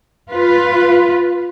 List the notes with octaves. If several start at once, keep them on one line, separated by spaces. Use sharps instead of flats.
F4 B4